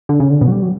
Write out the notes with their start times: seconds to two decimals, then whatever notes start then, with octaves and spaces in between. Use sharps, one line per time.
0.09 D3
0.20 C#3
0.31 D3
0.41 B2
0.48 F#3
0.52 G3
0.63 F#3